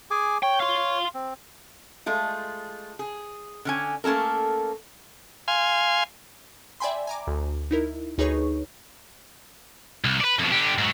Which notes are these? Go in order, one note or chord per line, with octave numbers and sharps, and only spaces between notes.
G#4 G#5 D6
C#5 G5
F5 C6
C4
G#3 A3 F4
G#4
D3 C#4 G#5
A3 A#3 C#4 A4 A#4
F5 G#5 C6
D5 E5 G5 G#5 B5 C6
G#5 A#5 D6
D2
D#4 E4 A#4
D2 D#4 G#4 B4 C#5 C#6
C2
B4 D5
F2 B2
D3 G4
G#2 F#3